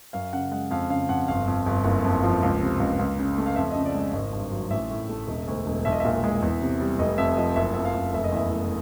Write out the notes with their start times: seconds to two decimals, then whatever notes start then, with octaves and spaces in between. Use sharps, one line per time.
0.13 F#2 F5
0.33 C#3 F#5
0.51 G#3 F#5
0.71 F2 F5
0.90 C#3 F5
1.09 F2 F#5
1.28 G1 F5
1.47 F2
1.66 G1
1.85 F#1
2.04 F2
2.23 F3
2.43 C#2
2.62 C3
2.80 C#2
2.99 C#2
3.19 C#3
3.38 A3
3.46 F5
3.56 F2 E5
3.71 C#3 D#5
3.85 D5
3.94 G#3 D#5
4.13 G#1 D#5
4.33 G2
4.51 F#3
4.70 A1 E5
4.91 A2
5.09 A3
5.27 E1
5.48 D2
5.66 E1
5.85 B1 E5
5.92 D#5
6.00 A#2 E5
6.24 G#3
6.42 E2
6.61 C3
6.80 G3
6.99 F1 D#5
7.18 F2 E5
7.37 F3 D#5
7.56 F#1 E5
7.74 F2 E5
7.85 F5
7.95 F#1
8.13 F1 E5
8.24 D#5
8.32 E2 E5
8.51 F1